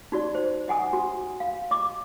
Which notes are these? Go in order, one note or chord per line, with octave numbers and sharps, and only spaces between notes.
D#4 F#4 D5
C5
D#5 F#5 G#5 D#6
F#4
F5
D#5 D6